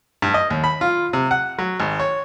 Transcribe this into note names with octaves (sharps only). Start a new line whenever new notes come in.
G2
D#5
D#2
B5
F4
C3
F#5
F#3
G#1
C#5